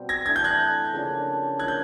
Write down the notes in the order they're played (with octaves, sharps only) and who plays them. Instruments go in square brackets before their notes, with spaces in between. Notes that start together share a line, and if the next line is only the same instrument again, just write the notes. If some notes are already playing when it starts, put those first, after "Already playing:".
Already playing: [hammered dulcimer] B2 G3 C4
[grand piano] G#6 A#6
[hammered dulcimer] E3 A3 D4 [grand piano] G#6
[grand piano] G6
F#6 G#6
[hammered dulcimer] C#3 F3 A#3 D4
[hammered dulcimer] A2 F3 A#3 [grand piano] F#6 G#6
[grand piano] G6